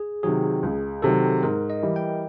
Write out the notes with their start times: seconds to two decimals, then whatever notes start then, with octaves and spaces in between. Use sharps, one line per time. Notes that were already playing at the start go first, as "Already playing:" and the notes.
Already playing: G#4
0.23 C3 D#3 F#3 G#4
0.63 C#2
1.02 C3 D#3 F#3 A4
1.43 G#2 A#4
1.70 D#5
1.83 E3 G3
1.96 G5